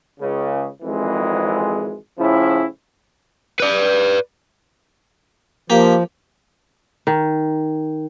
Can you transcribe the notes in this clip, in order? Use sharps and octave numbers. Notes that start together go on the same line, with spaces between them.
C#2 C#3
G#1 F2 E3 G#3
A2 C#3 F3 C#4 E4
B4 D5
F3 A#3 G4
D#3